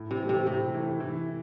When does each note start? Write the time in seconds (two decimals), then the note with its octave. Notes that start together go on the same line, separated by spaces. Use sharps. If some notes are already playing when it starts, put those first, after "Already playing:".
Already playing: A2
0.11 C3
0.20 E3 A3
0.29 C3
0.47 A2 C3
0.74 E3 A3
1.00 E3